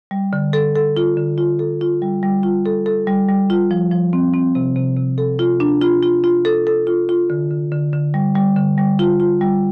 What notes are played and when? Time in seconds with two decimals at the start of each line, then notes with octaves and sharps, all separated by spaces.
0.11 G3
0.33 D3
0.53 A4
0.76 A4
0.97 F4
1.17 D3
1.38 F4
1.59 A4
1.81 F4
2.02 G3
2.23 G3
2.43 F4
2.66 A4
2.86 A4
3.07 G3
3.29 G3
3.50 F4
3.71 F3
3.92 F3
4.13 C4
4.34 C4
4.55 C3
4.76 C3
4.97 C3
5.18 A4
5.39 F4
5.60 D4
5.82 F4
6.03 F4
6.24 F4
6.45 A4
6.67 A4
6.87 F4
7.09 F4
7.30 D3
7.51 D3
7.72 D3
7.93 D3
8.14 G3
8.35 G3
8.57 D3
8.78 G3
8.99 F4
9.20 F4
9.41 G3